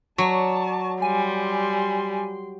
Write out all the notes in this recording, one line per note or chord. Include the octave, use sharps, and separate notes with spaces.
F#3 D5 A5 C#6
G3 G#5 C6